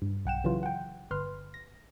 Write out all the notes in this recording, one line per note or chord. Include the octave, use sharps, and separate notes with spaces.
G2
B1 F#5 G5 E7
C#3 E3 F#3 F4
F#5 G5
G1 B4 C6 F6
A#6